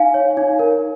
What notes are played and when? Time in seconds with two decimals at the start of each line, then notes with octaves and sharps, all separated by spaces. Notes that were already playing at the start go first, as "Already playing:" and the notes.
Already playing: D#4 F5 G#5
0.14 C#5
0.37 D#4
0.59 A#4